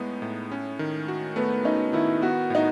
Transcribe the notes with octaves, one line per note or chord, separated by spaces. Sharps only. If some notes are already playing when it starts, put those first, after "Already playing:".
Already playing: A2 G#3 B3 D#4
A2
C#4
D#3
F#4
A3 B3
C#4 D#4
D#3 E4
B3 F#4
A2 D#4